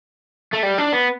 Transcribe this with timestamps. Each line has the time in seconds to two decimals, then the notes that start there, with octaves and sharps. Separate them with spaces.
0.53 A3
0.63 G3
0.78 D4
0.93 B3